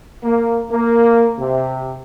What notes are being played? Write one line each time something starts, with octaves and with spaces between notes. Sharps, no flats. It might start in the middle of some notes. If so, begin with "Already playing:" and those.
A#3
A#3
C3